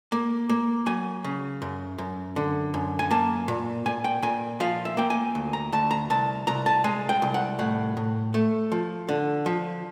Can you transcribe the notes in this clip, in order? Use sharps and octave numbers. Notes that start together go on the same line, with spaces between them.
A#3
A#3
F#3 G#5
C#3
F#2
F#2
D3
F#2
G#5
A#3 A5
A#2
A#2 G#5
G5
A#2 G#5
F3 F5
E5
A#3 G5
G#5
D2
A#5
D2 A5
A#5
C2 A5
C2 A#5
A5
G#3 G#5
G5
C2
F#5
A2 F#5
A2
A3
F3
D3
F3